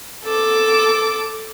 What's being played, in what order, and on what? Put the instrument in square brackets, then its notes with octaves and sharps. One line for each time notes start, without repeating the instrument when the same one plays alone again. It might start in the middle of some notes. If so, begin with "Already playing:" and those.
[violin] A4 D6